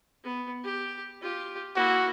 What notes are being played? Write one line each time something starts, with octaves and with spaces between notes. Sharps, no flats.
B3
G4
F4 G4
A#3 E4 F#4